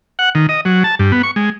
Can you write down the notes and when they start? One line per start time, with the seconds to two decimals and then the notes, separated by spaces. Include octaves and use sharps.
0.19 F#5
0.35 D#3
0.49 D#5
0.65 F#3
0.84 A5
0.99 G2
1.12 B3
1.23 C#6
1.36 G#3